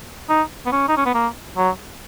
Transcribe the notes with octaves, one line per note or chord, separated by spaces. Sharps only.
D#4
B3
C#4
D#4
C#4
B3
A#3
F#3